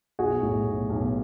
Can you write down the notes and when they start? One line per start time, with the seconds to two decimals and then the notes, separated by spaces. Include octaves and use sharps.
0.19 B1 F#4 G#4
0.42 A2
0.66 B1
0.90 B1